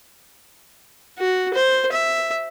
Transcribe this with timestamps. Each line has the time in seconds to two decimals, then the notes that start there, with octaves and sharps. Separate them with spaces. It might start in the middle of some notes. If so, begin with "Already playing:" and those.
1.19 F#4
1.54 C5
1.92 E5